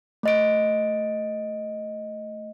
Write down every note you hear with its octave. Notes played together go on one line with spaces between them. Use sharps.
A3 D#5 D7